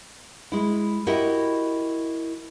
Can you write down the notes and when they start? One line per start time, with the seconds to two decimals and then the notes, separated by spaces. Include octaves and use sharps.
0.52 G#3 E4
1.07 E4 F#4 G4 A#4 D#5 E5